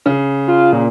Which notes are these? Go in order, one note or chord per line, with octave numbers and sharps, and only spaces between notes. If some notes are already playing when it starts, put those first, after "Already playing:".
C#3
F4
A#2